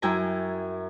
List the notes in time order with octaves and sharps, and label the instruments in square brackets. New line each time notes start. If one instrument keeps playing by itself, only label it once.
[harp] F#2 E4 G5 G#5 A#5